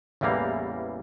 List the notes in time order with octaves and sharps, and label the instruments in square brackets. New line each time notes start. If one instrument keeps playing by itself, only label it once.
[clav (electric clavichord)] A1 E2 E3 G3 A#3 F5